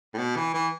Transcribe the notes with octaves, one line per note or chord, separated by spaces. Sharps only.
A2
B2
E3
E3